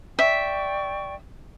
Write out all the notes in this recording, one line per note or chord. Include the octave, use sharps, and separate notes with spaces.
D5 E5 G5 C#6